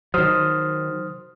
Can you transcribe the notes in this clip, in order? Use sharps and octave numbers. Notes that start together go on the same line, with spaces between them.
D#3 F#3 C5 D#6 F6